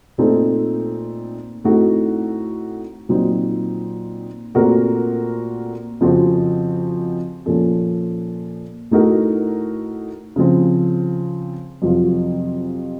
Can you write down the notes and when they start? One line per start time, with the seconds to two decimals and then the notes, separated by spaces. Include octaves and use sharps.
0.18 A#2 A3 C4 D#4 A4
1.64 A2 A3 C4 D#4 F#4
3.09 A#2 F#3 C4 D#4
4.54 A#2 A3 C4 F#4 A#4
6.01 F2 C#3 F3 C4 F#4
7.46 A#2 F3 A#3 C#4 A4
8.91 A2 A3 D#4 F#4 A#4
10.36 C#3 F3 C4
11.82 F2 C3 F#3 C4 F4